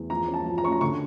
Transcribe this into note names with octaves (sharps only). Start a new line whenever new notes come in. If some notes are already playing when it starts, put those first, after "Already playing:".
Already playing: E2
F3 A#5
C#4
A5
F3
A#5
C#4 C#6
A#5
D3 C#6